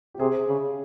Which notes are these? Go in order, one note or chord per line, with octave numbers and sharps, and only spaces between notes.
G4
C3 G#4
C#3